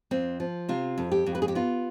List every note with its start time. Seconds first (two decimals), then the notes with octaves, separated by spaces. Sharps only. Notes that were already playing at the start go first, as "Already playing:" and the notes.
0.11 F2 C4
0.40 F3
0.69 C3 F4
0.98 F2
1.12 G4
1.26 F2
1.35 B4
1.42 G#4
1.48 G4
1.55 B3 F4